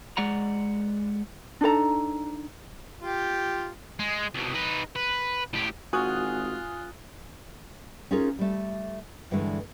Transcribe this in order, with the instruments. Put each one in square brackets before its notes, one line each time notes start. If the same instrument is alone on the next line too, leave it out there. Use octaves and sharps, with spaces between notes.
[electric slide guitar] G#3 D5 F#5 A#5
[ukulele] D4 D#4 A4 A#5
[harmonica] F4 G4
[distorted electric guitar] G#3
C2 B2
D#4 B4
B4
A2 G4
[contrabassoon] G#1 [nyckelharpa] F4 [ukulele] F#4 [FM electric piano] G#5 D#6 F#6
[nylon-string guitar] C#4 D#4 F4 G#4 A#4
G3 A3
G2 D3 E3 G#3 A3